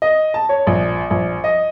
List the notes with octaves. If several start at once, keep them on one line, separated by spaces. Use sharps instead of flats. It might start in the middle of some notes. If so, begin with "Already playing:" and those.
D#5
A5
C#5
A#1
A#1
D#5